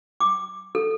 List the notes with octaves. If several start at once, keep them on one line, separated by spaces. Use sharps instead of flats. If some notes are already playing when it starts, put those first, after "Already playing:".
D6
A4